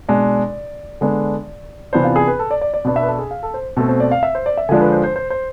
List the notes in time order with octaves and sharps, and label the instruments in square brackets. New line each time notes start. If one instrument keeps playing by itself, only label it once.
[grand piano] B2 G#3 D4 D5
D3 G#3 B3 D4
C3 E3 B3 D4 C5
F4
G#4
B4
A4
D5
D5
D5
B2 B3 D4
E5
B4
A4
G#4
F5
A4
C5
B2 A3 C4 A4
C5
D5
F5
E5
C5
D5
E5
D3 F3 G#3 D4 G#5
B4
C5
C5
C5
C5